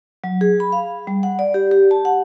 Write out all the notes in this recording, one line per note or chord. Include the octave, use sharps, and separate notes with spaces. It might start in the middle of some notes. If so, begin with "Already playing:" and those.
F#3
G#4
B5
F5
G3
F#5
D5
G4
G4
A5
F#5